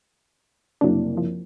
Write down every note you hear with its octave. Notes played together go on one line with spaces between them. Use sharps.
F#1 C2 F#3 D4
F3